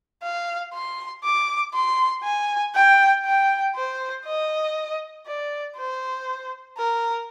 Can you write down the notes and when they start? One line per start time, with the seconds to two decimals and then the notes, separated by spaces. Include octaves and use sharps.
0.23 F5
0.73 C6
1.24 D6
1.74 C6
2.24 G#5
2.75 G5
3.26 G5
3.76 C5
4.25 D#5
5.26 D5
5.77 C5
6.78 A#4